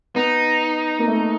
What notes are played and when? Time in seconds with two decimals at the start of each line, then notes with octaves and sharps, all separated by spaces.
0.15 B3 D#4
0.99 A#3
1.08 A3
1.16 A#3